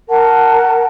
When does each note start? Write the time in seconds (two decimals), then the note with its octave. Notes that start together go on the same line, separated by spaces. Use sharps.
0.08 A#4 F#5 A5